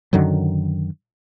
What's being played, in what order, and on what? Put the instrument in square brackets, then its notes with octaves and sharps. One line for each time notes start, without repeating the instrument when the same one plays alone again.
[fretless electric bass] F#2 D3 D#3 F#3